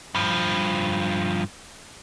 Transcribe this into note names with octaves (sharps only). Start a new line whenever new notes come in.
G2 F3